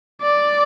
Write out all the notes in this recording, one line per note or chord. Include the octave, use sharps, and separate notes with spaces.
D5